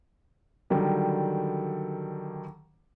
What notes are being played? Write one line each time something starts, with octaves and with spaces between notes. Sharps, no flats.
D3 D#3 F#3 G3